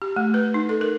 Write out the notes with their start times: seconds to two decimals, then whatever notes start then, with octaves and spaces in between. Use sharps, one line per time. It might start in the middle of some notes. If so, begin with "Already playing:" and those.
0.02 G4
0.16 A3
0.34 B4
0.54 D#4
0.69 A4
0.81 A#4